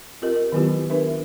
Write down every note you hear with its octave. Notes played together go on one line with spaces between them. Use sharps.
C4 F4 G4 A#4 D#5
D#3 F#3 B3 E4 F4 G4
D4 A#4 B4 E5